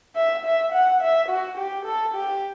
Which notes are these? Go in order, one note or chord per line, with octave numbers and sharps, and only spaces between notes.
E5
E5
F#5
E5
F#4
G4
A4
G4